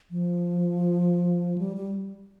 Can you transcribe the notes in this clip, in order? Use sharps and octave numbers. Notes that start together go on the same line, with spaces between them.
F3
G3
G3